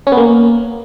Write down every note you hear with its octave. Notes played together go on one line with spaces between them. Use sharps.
C#4
B3
A#3